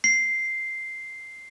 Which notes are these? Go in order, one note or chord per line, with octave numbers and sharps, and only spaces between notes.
C7